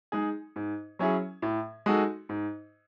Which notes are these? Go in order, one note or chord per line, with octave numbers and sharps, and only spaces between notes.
G#3 D#4 G#4
G#2
F#3 C#4 E4 G#4
A2
G#3 D#4 F#4 A4
G#2